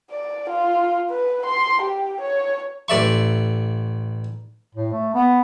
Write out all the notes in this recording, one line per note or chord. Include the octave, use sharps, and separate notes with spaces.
D5
F4
B4
C6
G4
C#5
A1 D5 E5 C#6
A2
A3
B3